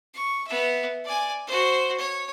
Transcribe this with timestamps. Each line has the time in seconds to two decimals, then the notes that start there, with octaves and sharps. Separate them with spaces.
0.14 C#6
0.47 B3 E5
1.04 D5 G#5
1.47 F#4 C5
1.99 C#5